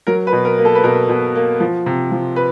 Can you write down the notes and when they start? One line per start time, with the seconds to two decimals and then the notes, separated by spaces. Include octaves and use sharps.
0.07 F#3 A#4
0.27 B4
0.33 B2
0.45 A#4
0.58 A#3
0.65 A4
0.75 B4
0.84 B2 A#4
1.09 B2
1.35 A#3
1.60 F3
1.86 C3
2.11 F3
2.36 B4